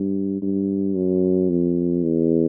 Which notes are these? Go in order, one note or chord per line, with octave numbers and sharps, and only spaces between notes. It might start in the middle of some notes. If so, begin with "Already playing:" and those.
Already playing: G2
G2
F#2
F2
E2